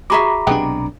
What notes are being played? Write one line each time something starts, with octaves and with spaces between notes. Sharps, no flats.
F#4 G#4 E5 A#5 B5 D6
B1 C3 G#3 B3 D4 G4